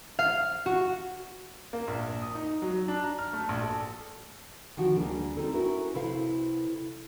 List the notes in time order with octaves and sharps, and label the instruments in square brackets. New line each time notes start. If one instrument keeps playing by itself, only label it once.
[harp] F5
F#4
[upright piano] A#3
A#1
D#6
D#4
F#3
D4
A#5
F6
A3
A#1
A4
[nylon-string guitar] C3 D#3 F3 F#4 G4
D2 G3 A#3 D4 G#4 A#4
C4 D#4 A4
C#4 E4 F#4 A#4 B4 C#5
C3 E4 A4 B4 F5